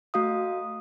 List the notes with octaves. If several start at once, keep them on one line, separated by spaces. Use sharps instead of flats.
A3 F#4 F5 D#6